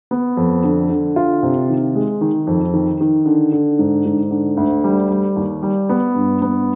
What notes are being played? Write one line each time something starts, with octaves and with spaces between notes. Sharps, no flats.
B3
F2
D3
D3
F4
C3
D#3
G#3
D#3
F2
D#3
D#3
D3
D3
G#2
G#2
D3
D2
G3
G3
D#2
G3
B3
G2
B3